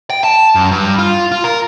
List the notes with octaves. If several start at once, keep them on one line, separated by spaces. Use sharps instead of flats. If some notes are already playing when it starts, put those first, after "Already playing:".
G5
A5
F#2
G2
F4
F4
A#4